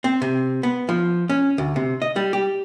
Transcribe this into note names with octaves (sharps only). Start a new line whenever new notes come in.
C4
C3
B3
F3
C#4
D2
C3
D#5
G3
G4